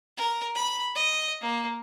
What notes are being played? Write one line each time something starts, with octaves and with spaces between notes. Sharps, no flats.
A#4
B5
D#5
A#3